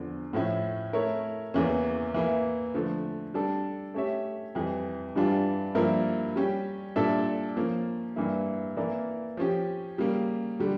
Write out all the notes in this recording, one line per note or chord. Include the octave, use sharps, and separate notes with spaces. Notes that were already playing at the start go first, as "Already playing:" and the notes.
Already playing: E2 D3 F3
A2 F3 C#4 E4
A3 E4 A#4 C#5
E2 C#3 E3 A#3 C#4
E3 A#3 E4
D3 F3 A3
G3 D4 A4
A3 C#4 G4 C#5 E5
F2 E3 G3
G2 E3 G3 D4 F4
G2 F3 A#3 E4 A#4
G3 C#4 G4
A#2 G3 D4 A4 E5
F3 A#3 C#4
G2 E3 A#3 E4
E3 A#3 E4 A#4 D5
F3 C#4 G4
C#3 G3 A#3
D3 G3